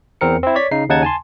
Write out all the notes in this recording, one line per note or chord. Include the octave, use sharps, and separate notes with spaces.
E2 C4 A#4 C#7
C4 E4
C#5 D5 G#6 B6
C#3 D#4 C7
D#2 C#3 D#4 F#5 A5 G#6
G#5 A5 C6